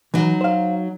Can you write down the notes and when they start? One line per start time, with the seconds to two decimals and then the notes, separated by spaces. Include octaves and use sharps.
0.14 E3 F#3 D#4
0.41 C5 F5